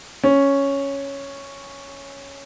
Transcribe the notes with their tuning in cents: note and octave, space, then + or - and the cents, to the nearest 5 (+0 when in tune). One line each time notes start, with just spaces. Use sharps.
C#4 +0